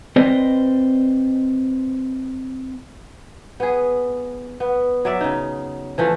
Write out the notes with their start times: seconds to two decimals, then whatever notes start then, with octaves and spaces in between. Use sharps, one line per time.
0.16 C4 B4 C5 D5 D#5
3.60 B3 G#4
4.60 B3
5.05 F#3 D5 E5
5.20 C#3 D#4
5.98 E3 F3 A3